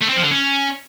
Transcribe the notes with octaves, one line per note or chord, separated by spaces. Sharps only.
A3
C4
F3
D3
C#4